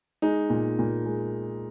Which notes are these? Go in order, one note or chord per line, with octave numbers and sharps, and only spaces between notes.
G#3 D#4
A#2
A#2
G#3